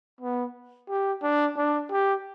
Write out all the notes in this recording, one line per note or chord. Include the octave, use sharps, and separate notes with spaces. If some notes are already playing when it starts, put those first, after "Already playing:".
B3
G4
D4
D4
G4